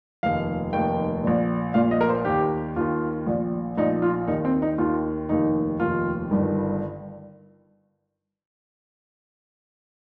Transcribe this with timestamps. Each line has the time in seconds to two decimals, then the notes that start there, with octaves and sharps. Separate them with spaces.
0.23 F1 D#2 D#3 F5
0.73 F1 D#2 D#3 G5
1.23 A#1 A#2
1.74 A#1 A#2 F5
1.91 D#5
2.01 A#4
2.09 C5
2.25 D#2 D#3 G4
2.76 D#2 D#3 F4
3.27 A#1 A#2
3.78 A#1 D#4
3.82 A#2
4.02 F4
4.28 D#2 D#3 D#4
4.45 C4
4.62 D#4
4.78 D#2 D#3 F4
5.29 F1 D#2 D#3 D#4
5.80 F1 D#2 D#3 F4
6.31 G1 G2 D#3